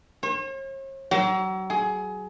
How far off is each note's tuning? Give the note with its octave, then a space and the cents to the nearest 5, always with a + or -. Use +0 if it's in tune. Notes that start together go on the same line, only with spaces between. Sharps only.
C#5 -45
F#3 +35
G#4 +20